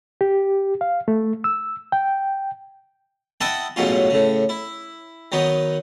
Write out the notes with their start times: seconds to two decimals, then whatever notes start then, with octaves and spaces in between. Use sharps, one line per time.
0.21 G4
0.81 F5
1.08 A3
1.44 E6
1.92 G5
3.41 E4 D#5 E5 F#5 G5 A5
3.76 A1 G#2 B2 F#3 C#4 F4
4.10 A2 C#3
4.49 E4
5.32 D#3 F#3 B3 D#4